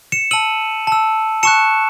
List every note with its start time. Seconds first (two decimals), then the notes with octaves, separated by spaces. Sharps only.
0.12 C#7 E7
0.31 A5 E6 D#7 F#7
0.87 A5 E6
1.43 A5 C#6 F#6 C#7 E7